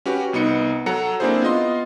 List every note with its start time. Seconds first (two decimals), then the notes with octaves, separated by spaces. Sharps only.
0.06 C#4 F#4 G4 B4
0.33 C2 B3 D#4 C#7
0.86 F#3 A4 F#5 A#5 C#7
1.20 A#3 C4 D4 E4 G#4 C5
1.42 B3 F4 D#5 C6